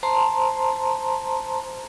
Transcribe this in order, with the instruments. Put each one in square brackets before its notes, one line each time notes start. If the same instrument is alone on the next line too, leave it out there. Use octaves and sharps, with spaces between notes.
[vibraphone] C5 A5 A#5 C6